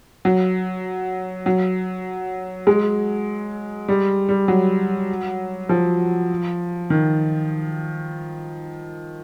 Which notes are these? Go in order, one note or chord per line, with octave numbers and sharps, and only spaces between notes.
F#3
F#3
G#3
G3
G3
F#3
F3
D#3